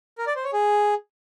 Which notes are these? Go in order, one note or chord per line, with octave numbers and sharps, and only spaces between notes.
A#4
D5
C5
C#5
G#4